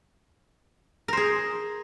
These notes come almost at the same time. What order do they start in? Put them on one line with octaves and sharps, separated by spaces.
A#4 C5 G#4